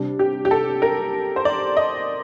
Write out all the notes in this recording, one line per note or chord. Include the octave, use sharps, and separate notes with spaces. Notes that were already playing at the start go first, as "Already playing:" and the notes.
Already playing: C3 G3 D4
G4
G4
A4
A#4
C5
D5
D#5